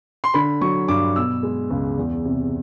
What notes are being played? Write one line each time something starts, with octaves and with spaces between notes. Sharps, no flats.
C6
D3 B5
F#3 C#6
G2 D6
B2 E6
G#3
C#2
E2
C3